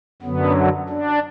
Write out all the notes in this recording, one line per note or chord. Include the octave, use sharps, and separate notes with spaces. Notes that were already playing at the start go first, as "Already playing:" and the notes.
F#2 D3 F#3 B3
D4